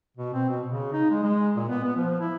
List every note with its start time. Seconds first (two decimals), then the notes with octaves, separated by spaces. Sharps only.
0.17 B2
0.34 C4
0.49 B2
0.68 C#3
0.93 D#4
1.10 G#3
1.23 G#3
1.56 A#2
1.69 B3
1.83 B3
1.96 F3
2.20 E4